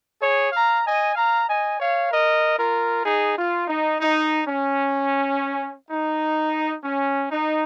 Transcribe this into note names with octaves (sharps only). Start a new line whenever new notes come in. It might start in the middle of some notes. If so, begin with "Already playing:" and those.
G#4 C#5
F5 A#5
D#5 G#5
F5 A#5
D#5 G#5
C#5 F5
A#4 D#5
F4 A#4
D#4 G#4
F4
D#4
D#4
C#4
D#4
C#4
D#4